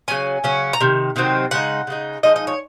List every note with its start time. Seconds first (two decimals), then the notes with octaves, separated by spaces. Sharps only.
0.08 C#3 F#3 C#4 G#5
0.44 C#3 F#3 C#4
0.73 A#5
0.81 C3 D#3
1.16 C3 D#3 F#3 C4
1.51 C#3 G#3 D#4 F#5
1.87 C#3 G#3 D#4
2.23 F3 G#3 D#4 D#5
2.36 D#5
2.47 C#5